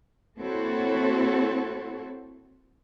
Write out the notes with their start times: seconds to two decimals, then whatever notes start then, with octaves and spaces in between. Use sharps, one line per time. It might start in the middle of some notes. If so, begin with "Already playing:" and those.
0.39 A#3 C4 E4 F#4 A4 C#5